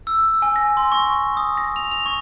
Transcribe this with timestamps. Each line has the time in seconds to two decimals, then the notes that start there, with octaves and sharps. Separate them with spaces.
0.07 E6
0.42 G#5
0.56 A#6
0.77 C6
0.92 C#6
1.37 D#6
1.57 A#6
1.76 F7
1.91 F7
2.06 C#6